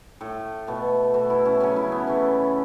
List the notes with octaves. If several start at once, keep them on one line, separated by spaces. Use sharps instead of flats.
A2 A3 A4
B2 A3
B2 A3 F#4
E4
C#4
C#3 F#3 A3 C#4
E4
B3
C#3 E3 A3 C#4